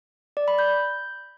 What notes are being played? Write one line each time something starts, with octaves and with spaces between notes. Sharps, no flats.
D5
B5
G6